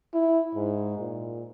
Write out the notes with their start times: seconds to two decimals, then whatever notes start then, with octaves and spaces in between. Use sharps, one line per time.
0.14 E4
0.55 G#2
0.99 A#2